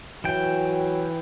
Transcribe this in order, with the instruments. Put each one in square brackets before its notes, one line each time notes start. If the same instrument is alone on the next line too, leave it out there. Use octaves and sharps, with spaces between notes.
[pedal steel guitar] E3 G5 [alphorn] F#3